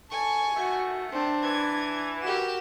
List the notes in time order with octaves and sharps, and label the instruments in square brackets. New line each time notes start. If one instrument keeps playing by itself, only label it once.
[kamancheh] A4 [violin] G#5 C#6
[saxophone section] D#3 A3 [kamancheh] F#4
[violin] C4 [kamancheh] D4
[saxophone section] E3 [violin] G#6
[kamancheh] F#4 A#4 [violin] G4 E7